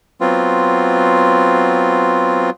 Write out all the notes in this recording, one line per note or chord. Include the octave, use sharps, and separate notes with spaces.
F#3 B3 C4 F4